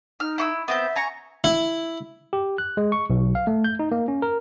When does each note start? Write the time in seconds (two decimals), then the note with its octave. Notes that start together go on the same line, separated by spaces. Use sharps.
0.20 D#4 F6
0.38 E4 C#6 E6
0.68 B3 C4 E5 G6
0.96 G#5 A#5 C#6
1.44 E4
2.33 G4
2.58 F#6
2.77 G#3
2.92 C#6
3.10 B1
3.35 F5
3.47 A3
3.64 G6
3.79 D#4
3.92 A#3
4.08 C#4
4.22 A#4